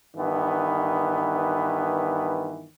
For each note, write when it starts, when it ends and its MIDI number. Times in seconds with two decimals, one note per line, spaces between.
0.16 2.67 43
0.16 2.67 51
0.16 2.67 52
0.16 2.67 59